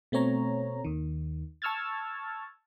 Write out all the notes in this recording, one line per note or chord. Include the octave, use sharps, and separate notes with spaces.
B2 A3 C4 C#5 A#5
D#2 D#3
A5 C#6 E6 F6 G#6 A6